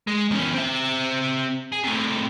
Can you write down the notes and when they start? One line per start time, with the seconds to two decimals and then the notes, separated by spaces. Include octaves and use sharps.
0.07 G#3
0.31 E2 C#4
0.55 C4 E5
1.72 G#4
1.84 A2 C3